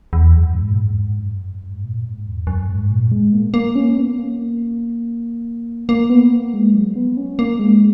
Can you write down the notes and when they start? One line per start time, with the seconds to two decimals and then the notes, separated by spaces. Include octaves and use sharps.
0.13 E2
0.35 F#2
0.55 G#2
0.70 A#2
0.77 G#2
1.19 F#2
1.63 G#2
1.84 A#2
2.04 G#2
2.26 E2
2.47 F#2
2.68 G#2
2.91 A#2
3.11 G#3
3.33 A#3
3.54 A#3
3.76 C#4
3.97 B3
4.19 A#3
5.89 A#3
6.10 B3
6.32 A#3
6.54 G#3
6.74 F#3
6.96 B3
7.17 C#4
7.39 A#3
7.59 G#3